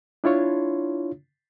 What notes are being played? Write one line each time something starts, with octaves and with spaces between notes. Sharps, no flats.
D4 E4 F4 C#5